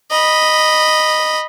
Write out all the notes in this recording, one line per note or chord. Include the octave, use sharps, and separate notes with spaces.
D#5 B5